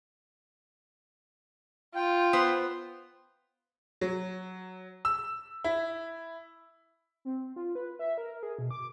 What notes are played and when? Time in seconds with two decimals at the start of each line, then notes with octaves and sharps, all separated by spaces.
1.95 F4 G5
2.33 B3 C5
4.01 F#3
5.05 E6
5.64 E4
7.25 C4
7.56 F4
7.75 B4
7.99 E5
8.18 A#4
8.43 G#4
8.59 B2
8.71 D6